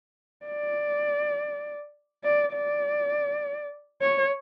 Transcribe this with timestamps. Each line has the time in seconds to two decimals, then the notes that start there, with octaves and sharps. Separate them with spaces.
0.46 D5
2.24 D5
2.53 D5
4.02 C#5